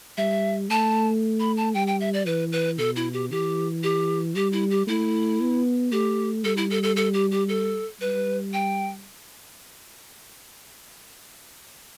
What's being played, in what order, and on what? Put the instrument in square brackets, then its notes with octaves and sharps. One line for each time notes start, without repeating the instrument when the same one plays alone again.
[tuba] G3 [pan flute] E5
[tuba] A3 [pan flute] A5
[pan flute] B5
A5
[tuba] G3 [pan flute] G5
[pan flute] G5
E5
D5
[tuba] E3 [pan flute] B4
[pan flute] B4
[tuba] B2 [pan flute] A4
[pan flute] E4
G4
[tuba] E3 [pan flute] G4
[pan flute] G4
[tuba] G3 [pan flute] G4
[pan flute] E4
G4
[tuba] A3 [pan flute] E4
[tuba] B3
[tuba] A3 [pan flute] G4
[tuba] G3 [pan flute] A4
[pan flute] E4
A4
A4
A4
G4
G4
A4
[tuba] G3 [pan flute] B4
[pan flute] G5